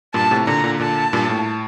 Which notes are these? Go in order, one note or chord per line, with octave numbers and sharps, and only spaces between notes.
G2 A#2 A5
A2 C3
A#2 D3 A#5
A#2 D3
A#2 D3 A5
G2 A#2
A2